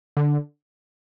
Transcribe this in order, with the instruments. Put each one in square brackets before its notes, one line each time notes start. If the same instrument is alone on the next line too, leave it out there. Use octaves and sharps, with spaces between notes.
[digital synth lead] D3